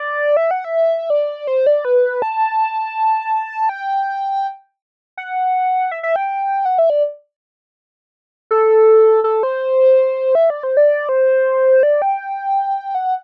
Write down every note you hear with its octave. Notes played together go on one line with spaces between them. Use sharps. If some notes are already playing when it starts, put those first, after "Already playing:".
Already playing: D5
E5
F#5
E5
D5
C5
D5
B4
A5
G5
F#5
E5
E5
G5
F#5
E5
D5
A4
A4
C5
E5
D5
C5
D5
C5
D5
G5
F#5